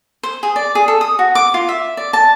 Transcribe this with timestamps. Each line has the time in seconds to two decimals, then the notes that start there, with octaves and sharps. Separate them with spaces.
0.23 C5
0.43 G#4
0.56 D5
0.75 G#4
0.88 A4
1.01 D#6
1.19 F#4
1.35 D6
1.54 F4
1.69 E5
1.97 D5
2.13 A5